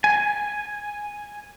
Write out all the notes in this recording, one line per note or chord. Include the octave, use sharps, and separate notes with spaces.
G#5